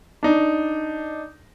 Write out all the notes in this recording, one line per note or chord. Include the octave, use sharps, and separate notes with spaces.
D4 D#4